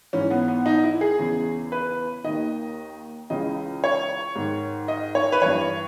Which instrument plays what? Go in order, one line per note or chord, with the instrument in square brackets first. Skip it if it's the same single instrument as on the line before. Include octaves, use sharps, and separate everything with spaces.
[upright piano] G#2 E3 C#4
B3
B3
D#4
E4
G#4
E2 C#3 E3
B4
D#2 D#3 D#5
C#2 C#3 E3 D#5
C#5
G#2 D#3
D#5
C#5
B4
G2 E3 C#5